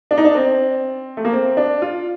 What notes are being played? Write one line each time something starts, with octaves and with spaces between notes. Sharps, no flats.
D4
D#4
D4
C4
A3
A#3
C4
D4
F4